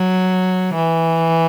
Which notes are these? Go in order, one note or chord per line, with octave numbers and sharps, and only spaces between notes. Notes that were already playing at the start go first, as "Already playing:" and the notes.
Already playing: F#3
E3